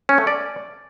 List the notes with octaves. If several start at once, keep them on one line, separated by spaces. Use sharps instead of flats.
C#4
A3
D5